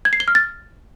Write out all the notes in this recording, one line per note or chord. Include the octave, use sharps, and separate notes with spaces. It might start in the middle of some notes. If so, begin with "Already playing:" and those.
G#6
C7
G7
F6
A6